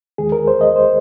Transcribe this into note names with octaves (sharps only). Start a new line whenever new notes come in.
D#2 D#3 G#3 G#4
A#4
C5
D#5
C5